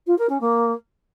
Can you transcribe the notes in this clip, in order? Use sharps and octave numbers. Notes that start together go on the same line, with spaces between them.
F4
A#4
C#4
A#3